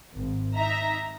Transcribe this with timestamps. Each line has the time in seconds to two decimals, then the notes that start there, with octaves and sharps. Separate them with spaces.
0.16 G#1
0.56 D#4 E5 A#5